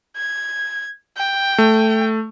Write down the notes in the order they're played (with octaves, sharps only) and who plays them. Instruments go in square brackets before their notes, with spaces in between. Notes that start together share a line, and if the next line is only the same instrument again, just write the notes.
[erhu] G#6
G5
[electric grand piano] A3